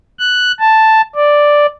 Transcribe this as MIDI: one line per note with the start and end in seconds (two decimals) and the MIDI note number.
0.19 0.52 90
0.59 1.01 81
1.15 1.66 74